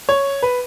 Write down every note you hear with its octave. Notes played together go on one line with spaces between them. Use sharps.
C#5
B4